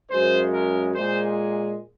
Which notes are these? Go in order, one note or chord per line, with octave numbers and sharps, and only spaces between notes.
F#2 C#3 G#3 C5
A#4
A#2 G#3 C5